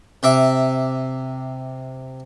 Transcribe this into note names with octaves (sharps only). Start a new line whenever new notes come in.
C3 E5 D6